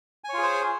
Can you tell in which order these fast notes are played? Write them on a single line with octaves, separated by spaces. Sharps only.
G#5 C#5 F4 G#4 C5